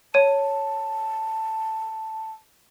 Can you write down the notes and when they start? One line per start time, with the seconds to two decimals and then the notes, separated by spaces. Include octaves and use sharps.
0.14 C#5 A5 D#7